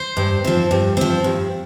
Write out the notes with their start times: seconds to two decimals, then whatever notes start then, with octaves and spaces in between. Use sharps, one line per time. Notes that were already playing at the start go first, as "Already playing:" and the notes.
Already playing: C5
0.17 G2
0.44 F3 C4
0.71 G2
0.97 F3 C4
1.24 G2